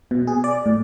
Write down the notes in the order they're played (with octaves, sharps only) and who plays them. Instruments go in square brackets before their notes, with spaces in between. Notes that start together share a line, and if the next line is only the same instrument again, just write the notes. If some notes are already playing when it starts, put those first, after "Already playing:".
[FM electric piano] B2
G#4
D5
A2